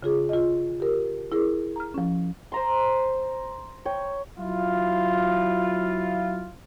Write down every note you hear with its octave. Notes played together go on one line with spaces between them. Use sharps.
C#3 F4 G#4
F4 D#5
G4 A#4
E4 G#4 A#4
A#5 F6
F3 C#4
C5 A#5 C6
C#5 G5
F#3 E4 F4